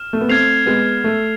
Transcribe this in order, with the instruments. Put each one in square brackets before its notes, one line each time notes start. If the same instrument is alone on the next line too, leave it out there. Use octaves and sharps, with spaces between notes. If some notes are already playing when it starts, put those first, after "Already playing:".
Already playing: [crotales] F6 E7
[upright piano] A3
B3
[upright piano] A3 C4 [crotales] F6 G#6 C7 F7
[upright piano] G#3 B3
A3